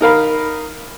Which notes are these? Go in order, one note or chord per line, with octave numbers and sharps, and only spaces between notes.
D#4 A#4 F5 B5